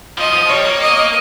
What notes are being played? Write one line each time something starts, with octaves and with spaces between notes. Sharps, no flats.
F3 D#5
F3
G3 C#5
A#3
D#5